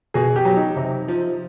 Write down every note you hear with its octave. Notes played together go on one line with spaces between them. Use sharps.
B2 G#4
G4
F#3
D#4
C3
F3